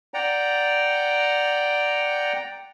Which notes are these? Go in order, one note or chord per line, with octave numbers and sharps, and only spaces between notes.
D5 F#5 G5 A#5